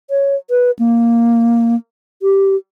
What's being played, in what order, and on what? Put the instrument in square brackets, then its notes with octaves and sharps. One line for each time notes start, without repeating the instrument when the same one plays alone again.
[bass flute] C#5
B4
A#3
G4